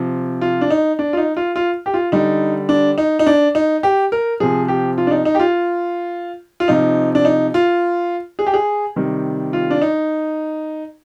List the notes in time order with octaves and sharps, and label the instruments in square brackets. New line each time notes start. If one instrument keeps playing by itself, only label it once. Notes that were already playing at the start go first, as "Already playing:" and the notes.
Already playing: [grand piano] C3 F3
F4
D4
D#4
D4
F4
D#4
F4
F4
G4
F4
D3 G3 D#4
D4
D#4
D#4
D4
D#4
G4
A#4
C3 F3 G#4
G4
F4
D4
D#4
D#4
G4
F4
F4
C3 F3 D#4
D4
D#4
F4
G#4
G4
G#4
C3 D#3 G3
F4
D4
D#4